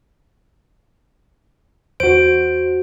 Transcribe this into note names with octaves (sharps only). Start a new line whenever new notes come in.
E2 F#4 C5 D7